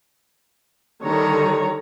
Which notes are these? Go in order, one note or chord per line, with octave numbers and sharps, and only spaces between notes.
D3 D#3 G3 C#5 A#5